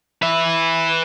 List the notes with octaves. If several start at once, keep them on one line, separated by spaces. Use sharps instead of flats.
B4 E5